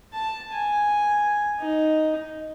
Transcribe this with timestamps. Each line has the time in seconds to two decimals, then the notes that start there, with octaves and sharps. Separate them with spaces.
0.13 A5
0.53 G#5
1.60 D#4